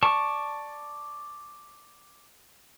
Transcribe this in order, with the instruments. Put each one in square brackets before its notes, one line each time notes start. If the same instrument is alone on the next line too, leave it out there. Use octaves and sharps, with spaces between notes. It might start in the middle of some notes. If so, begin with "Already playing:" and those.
[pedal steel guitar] D5 A5 C#6